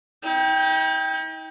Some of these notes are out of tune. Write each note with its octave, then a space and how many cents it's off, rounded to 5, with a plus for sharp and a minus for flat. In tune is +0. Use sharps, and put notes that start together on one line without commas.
D#4 +45 G5 +0